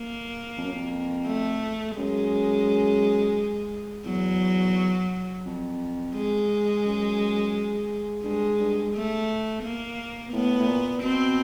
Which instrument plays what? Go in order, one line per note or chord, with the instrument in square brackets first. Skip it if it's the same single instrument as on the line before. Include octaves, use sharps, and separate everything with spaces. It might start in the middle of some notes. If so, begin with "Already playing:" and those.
Already playing: [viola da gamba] A#3
[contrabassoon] F2
F#2
F2
[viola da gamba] A3
[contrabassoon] F#2 [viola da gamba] G#3
[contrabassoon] E2 [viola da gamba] F#3
[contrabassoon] F2
[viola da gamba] G#3
[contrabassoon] F#2
[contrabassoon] G2 [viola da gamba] G#3
[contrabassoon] G2
[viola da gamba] A3
A#3
[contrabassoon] A2 [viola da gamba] B3
[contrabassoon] A2
A#2
[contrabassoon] B2 [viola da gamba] C4